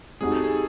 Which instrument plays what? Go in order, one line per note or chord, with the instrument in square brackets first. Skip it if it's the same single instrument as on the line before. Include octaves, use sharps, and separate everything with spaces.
[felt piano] G3 C4 D#4 F#4 [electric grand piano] G#4
[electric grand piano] A4
G#4